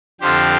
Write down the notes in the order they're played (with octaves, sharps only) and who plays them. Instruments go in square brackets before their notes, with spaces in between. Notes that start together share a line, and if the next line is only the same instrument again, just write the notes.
[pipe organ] F2 D3 F3 C4 F4 G4 C5